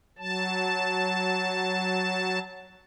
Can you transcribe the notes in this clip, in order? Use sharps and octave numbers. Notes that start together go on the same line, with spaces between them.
F#3 A5